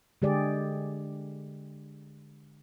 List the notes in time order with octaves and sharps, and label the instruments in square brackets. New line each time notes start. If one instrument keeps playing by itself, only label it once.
[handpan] D3 G#3 G4 G#4 D5